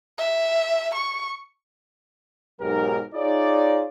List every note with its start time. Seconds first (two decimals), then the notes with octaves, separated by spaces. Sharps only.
0.18 E5
0.95 C#6
2.60 B1 G#2 F#3 G4 A#4
3.15 D#4 F4 G#4 C#5 D5